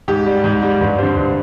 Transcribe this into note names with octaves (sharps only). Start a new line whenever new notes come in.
G#2 G4
G3
G#2
G3
G2
D3 G3 C5
G2